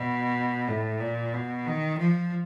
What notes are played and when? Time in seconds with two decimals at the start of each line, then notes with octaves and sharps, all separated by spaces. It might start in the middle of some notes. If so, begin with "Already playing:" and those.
Already playing: B2
0.67 A2
1.00 A#2
1.33 B2
1.66 D#3
1.98 F3